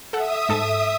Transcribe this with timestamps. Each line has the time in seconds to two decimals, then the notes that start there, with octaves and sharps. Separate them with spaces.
0.13 A4 E5 F#5 D#6
0.49 G#2 A4 A5